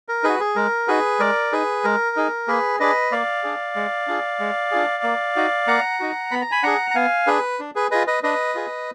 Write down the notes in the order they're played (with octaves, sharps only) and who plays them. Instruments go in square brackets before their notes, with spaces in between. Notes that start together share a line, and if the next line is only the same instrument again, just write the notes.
[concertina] A#4
D#4 F#4 G#4 B4
G#4
G#3 A#4
D#4 F#4 G#4 B4
G#3 A#4 D5
D#4 G#4 B4
G#3 A#4
D#4 G#4
A#3 G#4 B4
D4 G#4 B4 D#5
A#3 D5 F5
D4 G#4
G#3
D4 F4 G#4
G#3
D4 F4 G#4
A#3
D#4 F#4
A#3 F#5 A#5
D#4 F#4
B3 B5
A#5
G#5 B5
D4 G#4 F#5 A#5
A#5
B3 F5 G#5
D4 G#4 B4
D4
G#4 B4
F4 G#4 B4 D#5
B4 D#5
D4 B4 D#5
F4 G#4